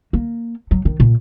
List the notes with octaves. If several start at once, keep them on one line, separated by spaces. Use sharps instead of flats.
A#3
F#3
D#3
A#2